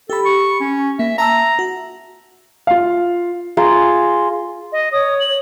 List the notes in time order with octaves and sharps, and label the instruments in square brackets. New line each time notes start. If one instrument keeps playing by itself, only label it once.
[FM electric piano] G4 B5 [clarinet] A4
[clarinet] C#6
C#4
[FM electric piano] A#3 [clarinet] E5
[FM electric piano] E5 A5 E6 [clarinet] A#5
[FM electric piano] F#4
[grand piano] F4 F5
[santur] F4 G#4 A#5 C6
[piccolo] D#5
[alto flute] C#5 [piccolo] D#6
[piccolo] F#7